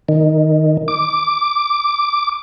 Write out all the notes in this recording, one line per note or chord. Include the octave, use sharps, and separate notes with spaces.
D#3
D6